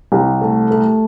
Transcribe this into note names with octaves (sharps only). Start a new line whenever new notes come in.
C2
A3
A3